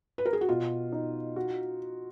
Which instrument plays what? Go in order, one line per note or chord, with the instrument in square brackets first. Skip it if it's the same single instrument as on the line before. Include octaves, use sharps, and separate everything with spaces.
[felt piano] B4
A#4
G#4
F#4
[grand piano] B2 [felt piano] F4
[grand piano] D#4
F#4